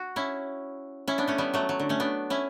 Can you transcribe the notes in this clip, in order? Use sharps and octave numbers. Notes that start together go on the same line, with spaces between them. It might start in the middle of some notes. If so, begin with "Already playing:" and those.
Already playing: F#4
C#4 E4
C#4 E4
B3 D4
A3 C#4
G3 B3
F#3 A3
F#3
D3
A3 C#4
B3 D4
C#4 E4